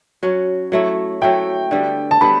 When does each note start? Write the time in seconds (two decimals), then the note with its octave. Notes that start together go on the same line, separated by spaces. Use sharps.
0.23 F#3 C#4 F#4
0.72 F#3 A3 E4
1.21 F#3 A3 E4 G5
1.71 D3 G3 B3
2.11 A5
2.21 D3 G3 B3 B5